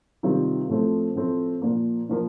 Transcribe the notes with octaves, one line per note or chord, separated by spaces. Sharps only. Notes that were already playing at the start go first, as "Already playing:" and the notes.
C3 D#3 G3 C4 F4
A2 F3 A3 C4
A2 F3 A3 C4
A#2 F3 A#3
A#2 F3 A#3